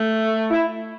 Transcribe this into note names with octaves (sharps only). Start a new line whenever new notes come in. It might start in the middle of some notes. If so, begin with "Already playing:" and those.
Already playing: A3
E4